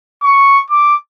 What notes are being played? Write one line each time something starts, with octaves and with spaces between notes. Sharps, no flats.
C#6
D6